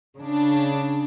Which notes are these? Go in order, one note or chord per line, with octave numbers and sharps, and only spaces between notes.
C#3 D4